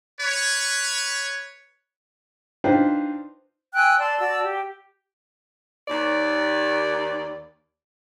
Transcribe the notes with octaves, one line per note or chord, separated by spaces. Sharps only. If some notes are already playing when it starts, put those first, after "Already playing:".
B4 C#5
D4 D#4 F4 B4 C5 G5
G5 G#5 E6 F#6
D5 A5 C6
F#4 D5 A5 E6
G4
D#2 D5